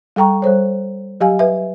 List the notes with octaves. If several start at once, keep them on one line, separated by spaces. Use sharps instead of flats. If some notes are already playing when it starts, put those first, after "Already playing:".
G3 A4 G5 A#5 C#6
G3 A4 C5 C#5
F#3 G4 F5 G#5
B4 E5